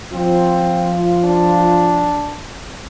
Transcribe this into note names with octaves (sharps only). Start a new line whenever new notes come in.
F3 C4 F4
D4